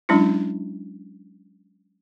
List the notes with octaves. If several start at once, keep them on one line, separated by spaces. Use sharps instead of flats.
F#3 G#3 C#4 D4 E4